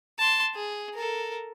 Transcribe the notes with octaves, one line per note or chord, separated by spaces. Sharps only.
A5 C6
G#4
A4 A#4